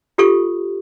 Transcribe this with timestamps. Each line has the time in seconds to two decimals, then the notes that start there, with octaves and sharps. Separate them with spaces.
0.18 F4 G4 A4 C#6